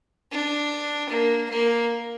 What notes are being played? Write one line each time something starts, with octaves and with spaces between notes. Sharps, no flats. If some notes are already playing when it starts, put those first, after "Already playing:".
D4
A#3
A#3